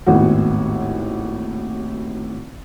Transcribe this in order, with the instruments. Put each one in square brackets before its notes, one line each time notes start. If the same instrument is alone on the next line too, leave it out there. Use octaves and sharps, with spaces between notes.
[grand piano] G#1 D#2 A2 B3 F#4